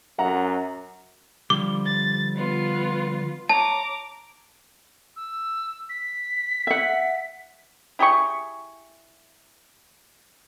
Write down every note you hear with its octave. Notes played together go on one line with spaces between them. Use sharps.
F#2 F#5 A#5
D3 F3 G3 D6
A6
B3 F4
C#5 A5 A#5 D6
E6
B6
E5 F#5
E4 G4 G#4 C#6